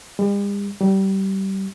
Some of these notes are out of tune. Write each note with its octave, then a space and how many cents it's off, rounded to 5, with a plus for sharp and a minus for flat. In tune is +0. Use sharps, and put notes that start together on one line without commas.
G3 +45
G3 -25